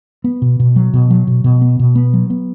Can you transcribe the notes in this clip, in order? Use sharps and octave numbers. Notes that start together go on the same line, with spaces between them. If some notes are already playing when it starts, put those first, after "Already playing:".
B3
B2
B2
F#3
B2
F#3
B2
B2
B3
B2
B3
F#3
B3